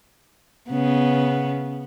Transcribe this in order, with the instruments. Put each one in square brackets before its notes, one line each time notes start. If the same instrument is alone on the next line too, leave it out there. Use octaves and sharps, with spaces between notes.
[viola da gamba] C#3 B3